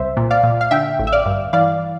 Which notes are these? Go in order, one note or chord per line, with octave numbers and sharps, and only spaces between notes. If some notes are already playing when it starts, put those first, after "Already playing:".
Already playing: C2 C5 E5
A#2
D5 F5
A#2
F5
D3 E5 G5
A1
E5
D5 F5
G2
E3 D5 F5